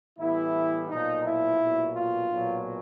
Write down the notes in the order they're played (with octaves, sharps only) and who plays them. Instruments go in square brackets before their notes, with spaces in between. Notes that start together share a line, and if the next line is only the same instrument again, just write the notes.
[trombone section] A2 E3 G3 B3 E4
B1 A#2 F3 D#4
E4
B1 A#2 F#3
F4
B1 A#2 F#3